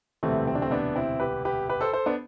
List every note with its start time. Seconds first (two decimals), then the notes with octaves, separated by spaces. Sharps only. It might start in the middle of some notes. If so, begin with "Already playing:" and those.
0.23 E1 D2 C3 E3 G3 A3 C4
0.47 C4
0.55 D4
0.62 A3 C4
0.71 B3 D4
0.96 C4 E4
1.20 G4 B4
1.45 G4 B4
1.69 G4 B4
1.81 A4 C5
1.93 A4 C5
2.06 B3 D4